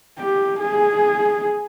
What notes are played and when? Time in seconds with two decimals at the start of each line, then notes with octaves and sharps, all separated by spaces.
0.19 G4
0.60 G#4